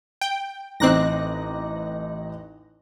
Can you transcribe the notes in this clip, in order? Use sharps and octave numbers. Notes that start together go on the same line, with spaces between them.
G5
A1 C4 D#4 D6 F#6 A#6